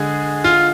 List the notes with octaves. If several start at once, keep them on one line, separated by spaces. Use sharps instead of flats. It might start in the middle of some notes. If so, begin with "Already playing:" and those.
Already playing: D3 G#3 G#4
F4